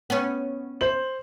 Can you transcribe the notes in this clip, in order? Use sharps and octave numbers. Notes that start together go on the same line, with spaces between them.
B3 C#4
C5 F#7